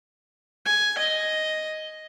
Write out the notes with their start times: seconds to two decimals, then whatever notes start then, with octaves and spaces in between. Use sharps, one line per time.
0.66 G#5
0.98 D#5